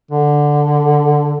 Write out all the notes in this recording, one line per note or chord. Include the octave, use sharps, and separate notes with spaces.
D3